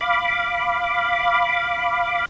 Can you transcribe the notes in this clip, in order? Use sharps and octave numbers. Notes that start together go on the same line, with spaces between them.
F5 B5 D6